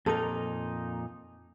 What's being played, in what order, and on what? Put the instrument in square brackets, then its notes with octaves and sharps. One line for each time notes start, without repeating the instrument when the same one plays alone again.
[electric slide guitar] F2 A#2 D#4 [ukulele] A4 A#4